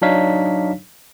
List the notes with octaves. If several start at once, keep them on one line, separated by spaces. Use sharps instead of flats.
F#3 D4 D#4 C#5 F5 B6